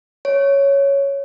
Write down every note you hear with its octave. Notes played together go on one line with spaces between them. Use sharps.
C#5